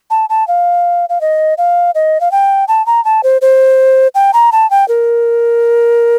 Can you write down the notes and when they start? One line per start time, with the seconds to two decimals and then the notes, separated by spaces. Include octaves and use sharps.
0.10 A5
0.30 A5
0.48 F5
1.09 F5
1.21 D#5
1.58 F5
1.95 D#5
2.21 F5
2.32 G5
2.68 A5
2.86 A#5
3.05 A5
3.24 C5
3.42 C5
4.15 G5
4.34 A#5
4.52 A5
4.71 G5
4.88 A#4